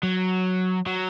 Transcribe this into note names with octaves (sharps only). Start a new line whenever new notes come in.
F#3
F#3